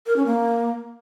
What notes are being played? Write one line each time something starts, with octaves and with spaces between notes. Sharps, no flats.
A#4
C#4
A#3